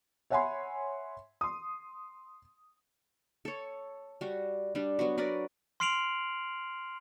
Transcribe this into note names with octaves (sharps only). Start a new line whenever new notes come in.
C#5 E5 F#5 G#5 B5 C6
C6 D#6
A4 C#5
G3 F#4
G3 D4
F#3 B3 F#4
F#4 A#4 B4 D5
C6 F6 C7 D7 F7 F#7